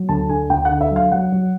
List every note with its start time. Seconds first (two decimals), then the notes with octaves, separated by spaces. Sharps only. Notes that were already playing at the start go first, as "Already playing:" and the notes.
Already playing: F#3
0.09 D2 A5
0.29 D3 G#5
0.50 D2 G5
0.65 F#5
0.70 D3
0.81 E5
0.91 F#3 F5
1.12 F#3 F#5
1.32 F#3